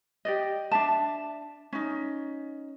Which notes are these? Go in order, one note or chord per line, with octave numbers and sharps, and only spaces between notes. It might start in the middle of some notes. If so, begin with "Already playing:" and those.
G4 D5 D#5
D4 E5 A5
C#4 D#4